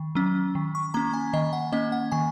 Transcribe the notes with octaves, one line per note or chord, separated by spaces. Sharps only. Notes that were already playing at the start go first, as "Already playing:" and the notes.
Already playing: D#3
F#3 C#4
D#3
C#6
A#3 C#4 A#5
G#5
D#3 D#5
F#5
A#3 C#4 D#5
F#5
D#3 G#5